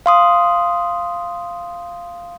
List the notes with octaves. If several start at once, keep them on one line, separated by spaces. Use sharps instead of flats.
F5 C6 D#6